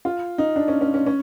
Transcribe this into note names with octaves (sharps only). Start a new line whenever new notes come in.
F4
D#4
D4
C#4
C#4
C#4
C#4